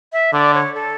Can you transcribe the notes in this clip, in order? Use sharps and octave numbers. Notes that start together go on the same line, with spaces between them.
E5
D3 D5
C#5
A4